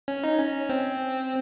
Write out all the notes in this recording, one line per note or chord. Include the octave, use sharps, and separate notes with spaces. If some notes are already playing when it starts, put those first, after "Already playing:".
C#4
D#4
C#4
C4